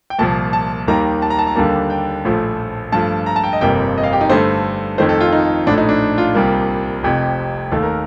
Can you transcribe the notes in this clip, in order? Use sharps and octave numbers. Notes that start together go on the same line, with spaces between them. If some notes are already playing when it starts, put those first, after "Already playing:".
G5
C2 A#2 F3 A5
A5
D#2 D#3 G3 A#3 A#5
A5
A#5
A5
A#5
D#2 D3 G3 A#3 A5
G5
A#1 A2 F3 A3
G2 F3 A3 A5
A#5
A5
G5
D#5
G1 F2 C3 G3 A#3 G5
D#5
F5
G4
D#4
G2 D3 A3 C5
F2 D#3 A3 C5
A4
F4
D#4
A#1 A2 A3 D4
D#4
D4
F4
C2 C3 G3 A#3
F1 F2 C3 G4
D#2 D#3 A3 A4
A#4